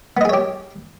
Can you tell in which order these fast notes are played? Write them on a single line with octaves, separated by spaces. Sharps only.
B3 D#5 G#4 C#5 G4